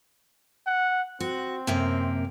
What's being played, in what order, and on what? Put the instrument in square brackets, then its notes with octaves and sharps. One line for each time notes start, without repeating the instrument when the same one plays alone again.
[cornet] F#5
[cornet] C4 [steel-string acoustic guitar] F#4
[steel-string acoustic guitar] F#2 C3 A#3